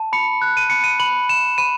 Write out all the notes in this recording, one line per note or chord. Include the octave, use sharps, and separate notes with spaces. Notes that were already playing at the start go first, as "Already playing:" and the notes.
Already playing: A5
B5 C#7
F#6
D#7
B5 C#7
D#7
B5 F#7
B5 E7
B5 D#7